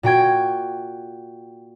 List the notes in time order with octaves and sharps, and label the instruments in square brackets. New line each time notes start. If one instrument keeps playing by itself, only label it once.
[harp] A#2 F#4 G5 G#6